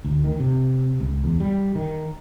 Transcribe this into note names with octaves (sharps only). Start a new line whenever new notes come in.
D2
D#3
C3
C#2
E2
G3
D#3